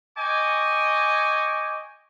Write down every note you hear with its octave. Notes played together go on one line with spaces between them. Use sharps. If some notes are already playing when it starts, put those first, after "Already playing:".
D#5 G5 G#5 C#6 D6